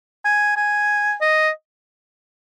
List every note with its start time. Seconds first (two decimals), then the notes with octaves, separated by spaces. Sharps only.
0.25 G#5
0.57 G#5
1.21 D#5